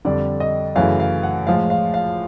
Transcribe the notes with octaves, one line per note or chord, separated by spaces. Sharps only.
F2 D3 G3 D5
D#5
F#2 C#3 E3 A3 F5
F5
F#5
A2 F3 G#3 F5
F5
F5